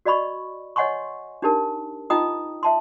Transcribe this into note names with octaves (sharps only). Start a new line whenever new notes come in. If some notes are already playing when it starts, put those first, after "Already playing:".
F#4 D5 D#5 B5 C#6
C#5 D#5 F#5 G#5 C6 C#6
D4 D#4 G4 A#4 A5
D#4 F4 D#5 G5 A#5 D#6
E5 A5 C6